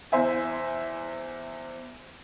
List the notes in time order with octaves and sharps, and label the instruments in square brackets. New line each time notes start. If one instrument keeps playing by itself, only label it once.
[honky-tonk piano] E2 C5 E5 G#5